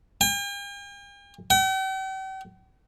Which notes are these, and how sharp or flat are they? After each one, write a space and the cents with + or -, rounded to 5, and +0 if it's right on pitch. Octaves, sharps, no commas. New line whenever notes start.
G5 +45
G5 -45